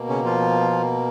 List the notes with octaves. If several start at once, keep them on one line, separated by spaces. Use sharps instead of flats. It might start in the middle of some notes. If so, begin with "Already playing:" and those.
Already playing: B2 A#3
C#3 C#4
F3 F4